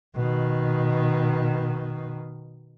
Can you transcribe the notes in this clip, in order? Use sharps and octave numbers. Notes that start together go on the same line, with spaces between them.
B2 D#3